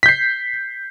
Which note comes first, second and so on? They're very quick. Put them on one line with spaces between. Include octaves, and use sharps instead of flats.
B6 G6 C7